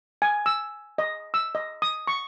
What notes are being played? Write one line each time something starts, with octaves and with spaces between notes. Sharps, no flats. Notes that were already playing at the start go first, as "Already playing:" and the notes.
G#5
E6
D#5
E6
D#5
D#6
C#6